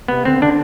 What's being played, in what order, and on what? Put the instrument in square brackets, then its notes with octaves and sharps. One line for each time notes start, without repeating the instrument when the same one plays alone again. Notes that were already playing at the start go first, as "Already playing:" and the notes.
[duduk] C3 [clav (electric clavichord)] B3
[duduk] D3 [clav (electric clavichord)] C4
[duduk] D3 [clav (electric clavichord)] D4